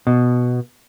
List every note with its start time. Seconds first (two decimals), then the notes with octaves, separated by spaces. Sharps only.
0.07 B2